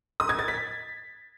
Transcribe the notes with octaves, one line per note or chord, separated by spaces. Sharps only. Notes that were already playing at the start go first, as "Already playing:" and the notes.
D#6
G#6
A6
B6